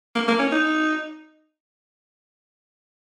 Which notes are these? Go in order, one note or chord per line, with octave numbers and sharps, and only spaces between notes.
A#3
A#3
C#4
D#4